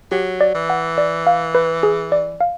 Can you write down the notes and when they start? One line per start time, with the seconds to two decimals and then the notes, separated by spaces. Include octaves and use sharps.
0.12 F#3 G4
0.41 D5
0.54 E3
0.70 F#5
0.98 D5
1.27 F5
1.55 B4
1.83 G#4
2.12 D5
2.41 F5